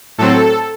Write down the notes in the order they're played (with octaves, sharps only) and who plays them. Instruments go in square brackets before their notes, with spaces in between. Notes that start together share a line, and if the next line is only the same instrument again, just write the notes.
[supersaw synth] A2 F#3 C4 A4